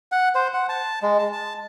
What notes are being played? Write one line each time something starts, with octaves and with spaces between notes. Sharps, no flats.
F#5
C5
F#5
A5
G#3
A5
A5